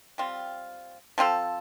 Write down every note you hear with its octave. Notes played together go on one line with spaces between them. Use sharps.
G3 C4 F4
F3 C4 F4 A4